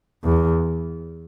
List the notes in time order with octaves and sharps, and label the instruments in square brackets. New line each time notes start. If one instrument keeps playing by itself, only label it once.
[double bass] E2